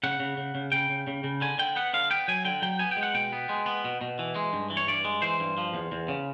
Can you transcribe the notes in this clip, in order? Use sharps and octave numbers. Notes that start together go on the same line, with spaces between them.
C#3 F#5
C#3
C#3
C#3
C#3 G5
C#3
C#3
C#3
D3 G#5
D3 G5
B3 F#5
D3 F5
B3 G5
F#3 G#5
D3 G5
F#3 G5
B3 G#5
G5
G#3
F#5
B2 G5
B3
G#3
B3
B2
B2
E3
G#3
G2
E3
C#5
G2 D5
G#3
E3 C5
G2
F3
E2
E2
C#3